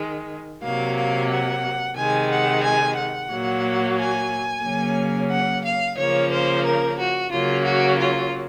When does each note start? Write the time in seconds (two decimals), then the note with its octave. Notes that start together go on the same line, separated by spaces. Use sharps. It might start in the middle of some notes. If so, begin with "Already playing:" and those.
Already playing: D#3 G#3
0.63 C3 F#3 A#3 F5
0.97 F5
1.30 F#5
1.96 C3 D#3 G#3 G#5
2.31 F#5
2.64 G#5
2.97 F#5
3.30 A#2 F#3 A#3
3.97 G#5
4.64 C#3 F#3 A#3
5.32 F#5
5.65 F5
5.98 C#3 F3 A#3 C#5
6.32 C5
6.66 A#4
6.99 F#4
7.31 C#3 F#3 A#3 F4
7.65 F#4
7.99 F4